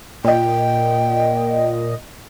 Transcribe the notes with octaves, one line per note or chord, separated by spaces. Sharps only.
A#2 D#5 G5